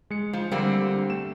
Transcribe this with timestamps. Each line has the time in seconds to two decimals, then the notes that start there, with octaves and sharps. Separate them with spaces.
0.10 G#3 C#7
0.33 F3
0.52 D3 G3 A#3 C4
1.10 A3 E7